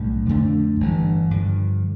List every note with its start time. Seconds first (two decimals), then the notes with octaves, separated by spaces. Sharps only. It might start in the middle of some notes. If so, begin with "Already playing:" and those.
Already playing: B1 A2 G3 D4
0.29 F2 D3 A3 D4
0.80 G1 G2 E3 G3
1.31 G2 D3 F3